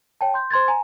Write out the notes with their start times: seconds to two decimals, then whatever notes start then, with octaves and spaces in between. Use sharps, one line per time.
0.21 C#5 G5 A5
0.34 C6 G6
0.51 C5 C6 G#6 A6
0.68 G#5 A#5